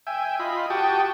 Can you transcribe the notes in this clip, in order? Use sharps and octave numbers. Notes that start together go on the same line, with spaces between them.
E5 G5 G#5
F4 D#5 B5
F#4 G4 G5 A5 C#6 D#6